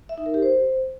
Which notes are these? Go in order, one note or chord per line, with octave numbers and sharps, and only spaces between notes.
E5
D#4
A#4
G4
C5